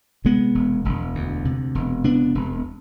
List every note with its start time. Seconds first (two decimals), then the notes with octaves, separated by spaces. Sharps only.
0.25 C3 G#3 B3
0.55 E1
0.85 E1
1.15 D2
1.45 C3
1.75 E1
2.04 C3 B3 D4
2.35 E1